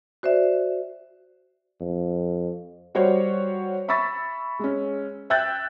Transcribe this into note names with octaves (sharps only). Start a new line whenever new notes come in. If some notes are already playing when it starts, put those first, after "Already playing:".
F#4 C5 D5 E5
F2
G3 F#4 C5 C#5
E5 B5 C#6 E6 A6 B6
G#3 C#4
E5 G5 E6 F#6 G6 A6